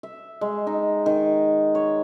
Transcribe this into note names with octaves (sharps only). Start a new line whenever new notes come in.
E5
G#3
D#4
D#3
C#5